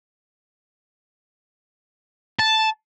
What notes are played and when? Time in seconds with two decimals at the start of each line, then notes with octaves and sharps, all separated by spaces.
2.39 A5